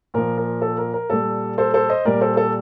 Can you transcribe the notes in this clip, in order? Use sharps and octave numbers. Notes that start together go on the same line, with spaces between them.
A#2 F3 A#4
A#4
A4
A#4
A#4
A#2 G3 A4
A4 C5
A4 C5
C5 D#5
A#2 G3 A#4 D5
A4 C5
A4